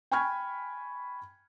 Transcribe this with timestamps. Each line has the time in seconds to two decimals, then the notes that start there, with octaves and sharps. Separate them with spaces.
0.11 G5 G#5 B5 C#6 F6 G#6